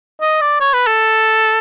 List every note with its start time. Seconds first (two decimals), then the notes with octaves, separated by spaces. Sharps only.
0.21 D#5
0.41 D5
0.61 C#5
0.74 B4
0.87 A4